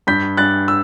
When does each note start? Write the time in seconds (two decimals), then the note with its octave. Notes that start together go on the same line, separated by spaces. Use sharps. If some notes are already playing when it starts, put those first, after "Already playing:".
0.07 G2 G6 B6
0.37 G2 F#6 A6
0.68 E6